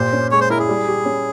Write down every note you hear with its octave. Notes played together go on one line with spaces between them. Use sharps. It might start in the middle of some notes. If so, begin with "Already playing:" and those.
Already playing: A#2 G4 C5
C#4
G#3 C#5
C5
E4 A#4
G#4
G3
G4
C#4